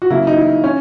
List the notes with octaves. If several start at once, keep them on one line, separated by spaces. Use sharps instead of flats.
F#4
C#3 F#3 A#3 E4
D#4
E4
C#4